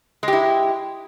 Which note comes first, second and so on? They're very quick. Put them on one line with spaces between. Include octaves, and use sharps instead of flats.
G#3 G4 E4